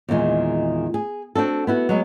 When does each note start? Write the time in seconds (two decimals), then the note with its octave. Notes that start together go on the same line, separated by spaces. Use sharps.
0.09 E2 A#2 D#3 G#3
0.94 G#4
1.35 C4 D4 F#4 A4
1.67 B3 E4 F#4
1.89 F#3 G#3 B3